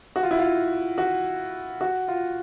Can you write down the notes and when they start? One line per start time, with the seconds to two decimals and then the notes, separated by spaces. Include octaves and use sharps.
0.16 F#4
0.23 F4
0.31 E4
0.39 F4
0.98 F#4
1.81 F#4
2.08 F4